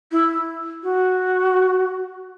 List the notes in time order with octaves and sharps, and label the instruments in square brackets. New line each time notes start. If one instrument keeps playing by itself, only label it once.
[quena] E4
F#4